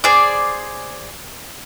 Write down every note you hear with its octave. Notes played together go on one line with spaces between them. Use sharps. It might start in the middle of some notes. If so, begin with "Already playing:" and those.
G#4 C5 D5